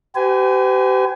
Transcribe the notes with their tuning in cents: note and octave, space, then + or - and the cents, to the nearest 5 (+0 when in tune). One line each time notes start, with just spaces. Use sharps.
G4 -35 B4 +45 G#5 +0